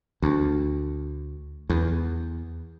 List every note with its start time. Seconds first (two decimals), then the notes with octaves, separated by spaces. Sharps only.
0.22 D2
1.70 E2